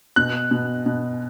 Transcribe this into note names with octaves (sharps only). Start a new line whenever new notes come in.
B2 F#6
B2
B2